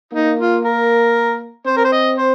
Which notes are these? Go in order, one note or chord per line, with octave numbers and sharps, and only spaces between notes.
A#3 D#4
F4
A#4
C4 C5
A#4
C5
D#5
C5